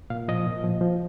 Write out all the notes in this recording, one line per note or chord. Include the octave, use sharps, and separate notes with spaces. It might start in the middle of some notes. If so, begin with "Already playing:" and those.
A#2 F5
F3 D#5
A#2
F3
F3